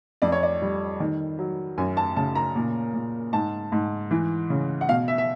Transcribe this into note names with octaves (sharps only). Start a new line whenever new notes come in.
F2 D5
C#5
D5
G3
D#3
F#3
F#2 G#5
A5
C#3 A5
A#5
A#2
A#2
G#2 A5
G#2
E3
C#3
F#5
B2 F5
E5
E5